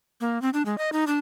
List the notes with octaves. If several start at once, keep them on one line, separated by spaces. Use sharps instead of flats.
A#3
C4
D4
G#3
D#5
D#4
D4